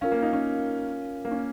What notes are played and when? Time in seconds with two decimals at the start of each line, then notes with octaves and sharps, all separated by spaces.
0.01 C#4 F4 A#4 F5
0.12 A#3
0.22 D#4
0.33 C#4
1.25 A#3
1.31 C#4